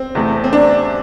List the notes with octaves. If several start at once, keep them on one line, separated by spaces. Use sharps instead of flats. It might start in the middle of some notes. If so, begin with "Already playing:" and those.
Already playing: C4
E2 C3 A3
C4
D4